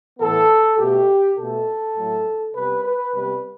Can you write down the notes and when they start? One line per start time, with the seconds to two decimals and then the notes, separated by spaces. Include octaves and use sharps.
0.19 A2 E3 B3 A4
0.78 B2 A3 G4
1.37 B2 A3 A4
1.96 A2 F#3 A3
2.55 C3 G3 B3 B4
2.84 B4
3.14 C3 G3 B3 B4